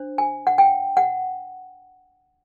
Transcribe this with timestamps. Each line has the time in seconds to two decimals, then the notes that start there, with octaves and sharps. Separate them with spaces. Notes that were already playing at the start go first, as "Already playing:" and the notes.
Already playing: D4 C5
0.18 G#5
0.47 F#5
0.58 G5
0.97 F#5